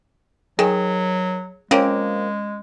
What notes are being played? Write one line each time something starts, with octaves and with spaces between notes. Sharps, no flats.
D#3 F#3 G#4
F3 G#3 A#3 C4 C#4